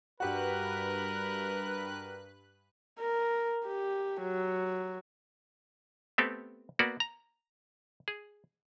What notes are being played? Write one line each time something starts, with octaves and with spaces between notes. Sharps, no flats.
G2 F#4 G4 A#4 B4 F#6
A#4
G4
F#3
A3 B3 C4 G4 A4
A#3 B3 F#4 D5
A#5
G#4